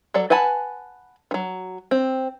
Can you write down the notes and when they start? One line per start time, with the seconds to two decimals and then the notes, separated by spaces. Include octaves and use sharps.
0.14 F#3 A4 D5
0.30 B4 F#5 G#5 A5 B5
1.31 D#3 F#3
1.91 C4